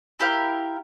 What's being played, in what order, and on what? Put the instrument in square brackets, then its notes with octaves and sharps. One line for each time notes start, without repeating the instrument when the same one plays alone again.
[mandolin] E4 G4 A#4 F5